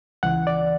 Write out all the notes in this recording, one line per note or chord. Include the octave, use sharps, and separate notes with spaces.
C#2 C#3 E3 F#5
D5